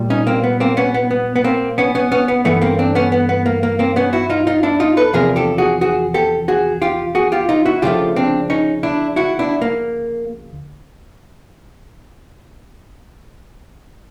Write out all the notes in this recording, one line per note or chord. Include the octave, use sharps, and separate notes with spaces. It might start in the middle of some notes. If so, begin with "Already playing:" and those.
Already playing: A#2 G3
C#4 D#4
A#3 C4
B3
A#3 C4
B3 C#4
B3
B3
B3
A#3 C4
B3 C#4
B3 C#4
B3 C#4
B3
G2 E3 A3 B3
A#3 C4
C4 D4
B3 C#4
B3
B3
A#3
A#3
A#3 C4
B3 C#4
E4 F#4
D#4 F4
D#4 F4
D4 E4
D#4 F4
A4 B4
E2 C3 F3 G#4 A#4
G4 A4
F#4 G#4
F#4 G#4
G4 A4
F#4 G#4
F4 G4
F#4 G#4
F4 G4
D#4 F4
E4 F#4
D2 C#3 F3 A3 F4 G4
C4 D4
C#4 D#4
D4 E4
E4 F#4
D4 E4
A#3